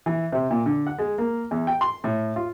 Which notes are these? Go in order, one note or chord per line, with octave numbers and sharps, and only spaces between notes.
E3
C3
A#2
D3
F#5
G#3
A#3
E2
G5
C6
A2
F4